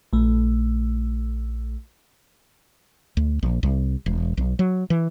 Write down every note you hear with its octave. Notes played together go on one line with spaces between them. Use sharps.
A#1 A3
D2
A#1
C2
E1
B1
F#3
E3